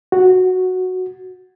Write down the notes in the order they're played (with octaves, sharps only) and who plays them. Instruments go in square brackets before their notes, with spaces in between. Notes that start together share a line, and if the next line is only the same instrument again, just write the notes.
[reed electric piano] F#4